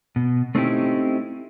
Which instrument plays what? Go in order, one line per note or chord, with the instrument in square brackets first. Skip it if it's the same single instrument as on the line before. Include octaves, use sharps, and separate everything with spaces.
[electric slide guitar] B2
A3 C4 C#4 D#4 E4 G4